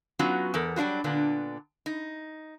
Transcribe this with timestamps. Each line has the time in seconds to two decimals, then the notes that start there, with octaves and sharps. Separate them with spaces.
0.19 F#3 B3 C#4 D#4 F4 F#4
0.54 E2 B3 A4 A#4
0.76 F#3 G3 D4 F4 F#4
1.04 A#2 D3 B3 D4
1.86 D#4